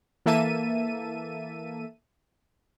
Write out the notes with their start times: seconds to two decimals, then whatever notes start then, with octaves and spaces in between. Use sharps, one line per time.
0.26 E3 A#3 A4 E5 A5 D#7